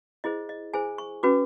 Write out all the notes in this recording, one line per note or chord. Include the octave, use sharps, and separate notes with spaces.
E4 G#4 C5 D#5
D#5
E4 G#4 C5 G#5
C#6
C#4 F#4 B4 D6